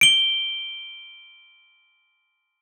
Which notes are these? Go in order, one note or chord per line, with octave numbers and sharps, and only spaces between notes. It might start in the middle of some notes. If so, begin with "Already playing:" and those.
D7 G7